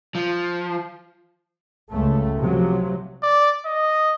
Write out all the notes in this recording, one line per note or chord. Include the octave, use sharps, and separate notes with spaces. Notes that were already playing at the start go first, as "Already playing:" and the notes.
F3
C#2 A3
C3 F3 F#3
D5
D#5